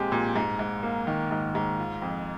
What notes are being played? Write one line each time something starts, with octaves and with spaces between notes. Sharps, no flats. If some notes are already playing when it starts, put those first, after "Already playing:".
Already playing: A#2 G#3 C4 G4
A#2
G#2
G#2
A#3
D#3
G#2
G#2
F4
F2